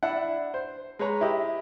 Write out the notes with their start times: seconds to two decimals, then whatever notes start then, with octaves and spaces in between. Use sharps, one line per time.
0.03 D4 E4 F#5
0.54 C5
0.99 G#3 B4 C#5 A#5
1.21 E4 G4 D#5